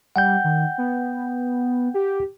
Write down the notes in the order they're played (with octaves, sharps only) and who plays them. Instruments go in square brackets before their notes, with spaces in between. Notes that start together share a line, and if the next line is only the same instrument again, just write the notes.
[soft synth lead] G3 [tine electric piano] F#5 G5 G6
[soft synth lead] D#3
B3
G4